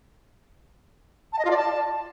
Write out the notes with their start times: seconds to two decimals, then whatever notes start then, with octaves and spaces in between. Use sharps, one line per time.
1.33 A5
1.39 D#5
1.45 F4
1.51 D5
1.57 A5